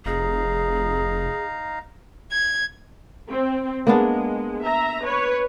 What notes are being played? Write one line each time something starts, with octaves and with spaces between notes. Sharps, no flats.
F1 D#4 G#4 F5 A#5
G#6
C4
G#3 A#3 B3 D4
E5 A#5
B4 C#5